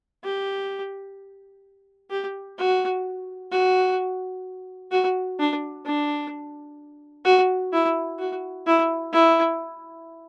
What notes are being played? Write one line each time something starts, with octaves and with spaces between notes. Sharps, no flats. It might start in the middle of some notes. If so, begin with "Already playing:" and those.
G4
G4
F#4
F#4
F#4
D4
D4
F#4
E4
F#4
E4
E4